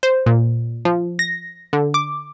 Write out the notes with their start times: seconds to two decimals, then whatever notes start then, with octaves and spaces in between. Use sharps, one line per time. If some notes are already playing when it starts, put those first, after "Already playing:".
0.03 C5
0.26 A#2
0.85 F3
1.19 A#6
1.73 D3
1.94 D6